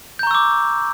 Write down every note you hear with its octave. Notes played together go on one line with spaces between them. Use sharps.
A#5 C#6 D6 E6 G6